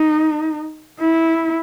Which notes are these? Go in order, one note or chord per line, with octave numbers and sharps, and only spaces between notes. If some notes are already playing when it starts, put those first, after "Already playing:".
Already playing: D#4
E4